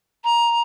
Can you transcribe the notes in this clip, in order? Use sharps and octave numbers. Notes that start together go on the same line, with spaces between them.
A#5